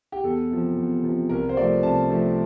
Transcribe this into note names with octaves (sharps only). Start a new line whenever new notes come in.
G4
E2 A4
C3 F3
E2
C3 F3
C2 A#4
C5
C3 F3 A3 D5
C2 A5
C3 F3 A3